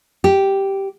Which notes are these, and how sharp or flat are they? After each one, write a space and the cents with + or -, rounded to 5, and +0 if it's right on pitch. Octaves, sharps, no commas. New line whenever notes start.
G4 -5